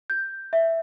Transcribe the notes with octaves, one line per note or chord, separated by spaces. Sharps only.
G6
E5